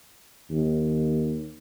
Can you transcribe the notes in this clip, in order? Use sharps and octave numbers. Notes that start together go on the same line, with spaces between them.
D#2